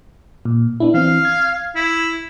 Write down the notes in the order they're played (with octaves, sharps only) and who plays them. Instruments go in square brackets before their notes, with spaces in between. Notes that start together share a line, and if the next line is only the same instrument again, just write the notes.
[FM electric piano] A#2
B3 D4 E4
[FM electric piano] E3 C4 [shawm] F5
[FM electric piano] G#6
[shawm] E4